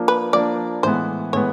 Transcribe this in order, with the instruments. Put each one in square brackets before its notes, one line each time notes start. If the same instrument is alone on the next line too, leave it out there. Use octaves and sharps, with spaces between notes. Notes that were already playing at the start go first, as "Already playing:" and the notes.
Already playing: [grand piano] F3 A#3 D4
[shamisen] B4
[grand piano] F3 A#3 D4 [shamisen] D5
[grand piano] A2 E3 G#3 B3 [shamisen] C5
[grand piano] A2 E3 G#3 B3 [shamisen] C#5